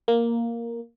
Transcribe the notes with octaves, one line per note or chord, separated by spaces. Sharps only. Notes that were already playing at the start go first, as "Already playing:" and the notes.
A#3